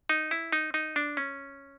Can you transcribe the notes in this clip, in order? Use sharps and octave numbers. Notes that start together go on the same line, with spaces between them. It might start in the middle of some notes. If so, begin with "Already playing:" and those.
D#4
E4
D#4
D#4
D4
C#4